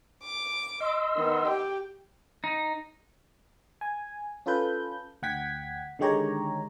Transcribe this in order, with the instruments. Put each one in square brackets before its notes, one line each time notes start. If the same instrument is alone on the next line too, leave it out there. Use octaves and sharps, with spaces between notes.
[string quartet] D6
[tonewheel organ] D#5 C6 E6
[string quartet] D#3 B3
G4 G5
[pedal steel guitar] D#4
[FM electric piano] G#5
C#4 F4 A4 B4 G6
D2 F#5 G5 G#6 B6
D3 D#3 G#3 G4 C#5 A#5